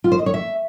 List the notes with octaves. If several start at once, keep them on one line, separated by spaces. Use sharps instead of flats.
F4
C5
D#5
C#5
E5